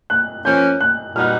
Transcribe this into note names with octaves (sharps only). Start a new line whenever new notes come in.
F#6
F3 A#3 C#4 G6
F#6
A#2 G3 B3 D#4 F#4 F6